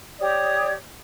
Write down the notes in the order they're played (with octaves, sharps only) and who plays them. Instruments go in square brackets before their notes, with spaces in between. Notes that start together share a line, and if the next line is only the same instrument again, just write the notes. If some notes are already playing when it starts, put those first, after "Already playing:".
[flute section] G4 C#5 D5 D#6